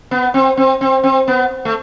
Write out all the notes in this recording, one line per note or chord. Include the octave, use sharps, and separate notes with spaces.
B3
C4
C4
C4
C4
B3
A3